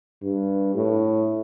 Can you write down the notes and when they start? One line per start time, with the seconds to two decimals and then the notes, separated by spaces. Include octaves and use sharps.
0.23 G2
0.75 A2